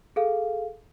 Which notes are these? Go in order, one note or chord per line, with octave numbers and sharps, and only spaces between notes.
G#4 A4 F5